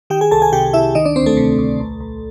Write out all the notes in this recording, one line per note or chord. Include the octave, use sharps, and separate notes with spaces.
D#3 G4 G5
G#4 G#5
C2 A4 A5
G#4 G#5
C3 G4 G5
C2 E4 E5
D#3 D#4 D#5
D4 D5
D2 C4 C5
A3 A4
C3
D2
B1
B1